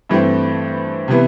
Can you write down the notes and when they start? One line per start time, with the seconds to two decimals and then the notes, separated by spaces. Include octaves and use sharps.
0.10 G2 E3 A3 C4
1.08 C3 E3 B3